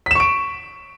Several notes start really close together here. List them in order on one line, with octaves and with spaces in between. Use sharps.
B6 E7 C#6 D7